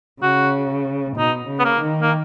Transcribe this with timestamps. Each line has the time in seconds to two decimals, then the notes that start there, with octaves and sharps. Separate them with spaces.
0.22 C#3 F#4
1.17 B2 D#4
1.48 C#3
1.60 B3
1.65 A#3
1.80 D#3
2.02 A#3